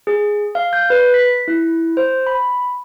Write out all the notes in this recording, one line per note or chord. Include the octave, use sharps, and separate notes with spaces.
G#4
F5
G6
B4
B6
E4
C5
B5